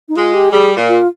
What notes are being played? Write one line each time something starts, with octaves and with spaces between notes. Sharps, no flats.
D#4
G#3 F4
G4
G3 G#4
A#2
F4